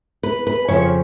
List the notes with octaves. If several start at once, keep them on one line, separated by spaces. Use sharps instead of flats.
B4
B4
F2 C#3 F3 C#5